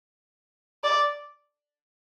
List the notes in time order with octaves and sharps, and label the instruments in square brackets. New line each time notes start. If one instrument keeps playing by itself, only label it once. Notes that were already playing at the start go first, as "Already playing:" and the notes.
[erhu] D5